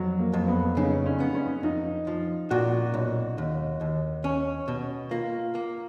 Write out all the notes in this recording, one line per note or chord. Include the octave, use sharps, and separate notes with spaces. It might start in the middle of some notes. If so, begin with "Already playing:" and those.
Already playing: F2 F#3
A#3
F2
B3
C#3 D#4
C#4
B3
C#4
F2 D#4
F3
A#2 F#4
B1
D#2
D#2
C#4
B2
A#3 F4
A#3